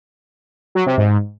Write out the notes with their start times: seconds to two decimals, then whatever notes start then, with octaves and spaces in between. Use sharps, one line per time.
0.75 F#3
0.86 C3
0.98 G#2